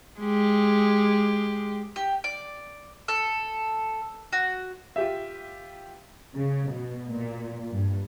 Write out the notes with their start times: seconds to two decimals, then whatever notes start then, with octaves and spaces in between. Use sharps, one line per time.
0.20 G#3 G4
1.96 G4
2.24 D5
3.08 A4
4.33 F#4
4.96 F4 G4 E5
6.34 C#3
6.70 B2
7.08 A#2
7.72 G2